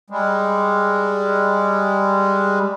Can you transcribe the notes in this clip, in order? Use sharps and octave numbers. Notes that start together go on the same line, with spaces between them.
G3 G#3